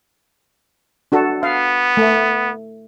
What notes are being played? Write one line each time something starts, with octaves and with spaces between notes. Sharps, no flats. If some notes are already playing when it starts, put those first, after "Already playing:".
D4 F#4 A4
B3 F5
A3